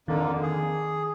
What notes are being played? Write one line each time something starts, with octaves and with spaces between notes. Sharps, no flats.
F2 D3 D#3 A#3
G#4